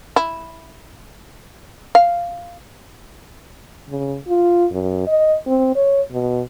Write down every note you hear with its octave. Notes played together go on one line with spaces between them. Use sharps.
E4
F5
C#3
F4
F#2
D#5
C4
C#5
B2